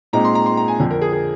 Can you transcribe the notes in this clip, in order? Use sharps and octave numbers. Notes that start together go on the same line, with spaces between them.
A#2 G#3 C4 D#4 A#5
C6
A#5
C6
A#5
G#5
F2 D3 F3
A#4
G#4
G#4